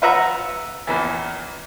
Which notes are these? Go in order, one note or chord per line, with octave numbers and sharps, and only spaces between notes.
F4 B4 E5 F#5 A#5
A#1 E2 E3